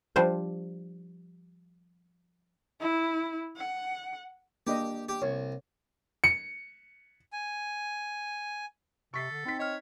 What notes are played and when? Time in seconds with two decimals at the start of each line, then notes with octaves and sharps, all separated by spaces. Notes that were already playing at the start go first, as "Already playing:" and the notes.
0.16 F3 G3 D4 C5
2.80 E4
3.57 F#5
4.67 A#3 D4 G4 D#5
5.09 G4
5.22 C2 C#5
6.24 C#7
7.32 G#5
9.14 C3 A4 C#6 B6 C7
9.31 D3
9.45 C4 D#4 B6
9.59 C#5 D#5 F6